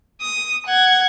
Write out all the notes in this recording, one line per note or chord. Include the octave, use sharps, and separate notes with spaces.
D#6
F#5 G#6